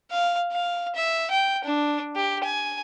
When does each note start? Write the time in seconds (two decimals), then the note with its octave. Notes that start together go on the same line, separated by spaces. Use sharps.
0.11 F5
0.52 F5
0.95 E5
1.30 G5
1.65 D4
2.16 G4
2.44 G#5